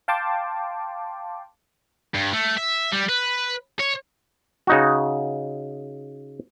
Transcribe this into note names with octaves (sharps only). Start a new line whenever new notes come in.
F5 G5 A5 C6 D6
G2
A3
E5
G3
B4
C#5
C#3 D#4 F#4